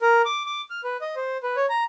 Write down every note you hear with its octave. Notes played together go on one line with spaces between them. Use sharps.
A#4
D6
D6
F6
B4
D#5
C5
B4
C#5
A#5